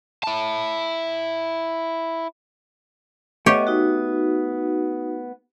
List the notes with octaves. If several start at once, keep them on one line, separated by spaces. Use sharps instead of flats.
E4 A5
A3 B3 G4 C#5 D#5
D#4 F#4